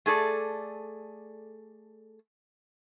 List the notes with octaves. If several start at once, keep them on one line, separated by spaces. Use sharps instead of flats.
A3 G#4 A4 D5